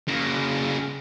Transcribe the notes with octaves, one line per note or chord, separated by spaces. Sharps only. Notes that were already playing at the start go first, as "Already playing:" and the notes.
C#3 A#3